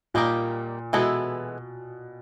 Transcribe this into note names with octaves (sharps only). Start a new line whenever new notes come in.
A#2 G3 A#3 D#4 G4 A#4
B2 E3 G#3 B3 E4 A4